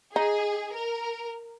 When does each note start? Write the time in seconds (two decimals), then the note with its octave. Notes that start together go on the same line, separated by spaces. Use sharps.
0.15 D#4 G#4
0.74 A#4